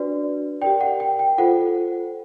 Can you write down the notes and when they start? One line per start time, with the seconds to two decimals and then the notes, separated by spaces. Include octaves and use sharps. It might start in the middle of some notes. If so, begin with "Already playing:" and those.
Already playing: D4 F#4 B4 D5
0.62 G4 A#4 D5 G5
0.81 F#5
1.00 G5
1.19 G5
1.38 F4 A4 C5 F#5